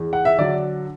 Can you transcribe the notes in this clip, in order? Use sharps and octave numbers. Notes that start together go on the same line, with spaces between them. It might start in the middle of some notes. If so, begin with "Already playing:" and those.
Already playing: E2
F#5
E5
D3 F#3 D5